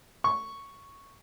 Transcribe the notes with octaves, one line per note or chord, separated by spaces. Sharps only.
C#6